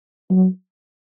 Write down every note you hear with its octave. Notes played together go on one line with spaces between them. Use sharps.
F#3